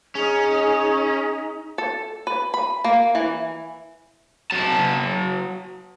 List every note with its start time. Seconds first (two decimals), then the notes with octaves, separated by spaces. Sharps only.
0.15 C#4 D#4 G#4
1.78 A4
2.27 B4
2.54 B5
2.84 A#3
3.15 E3
4.51 F#3 A5